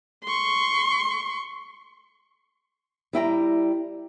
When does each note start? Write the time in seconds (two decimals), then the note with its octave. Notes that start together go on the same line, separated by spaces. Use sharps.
0.24 C6 C#6
3.13 G3 E4 G5 A#5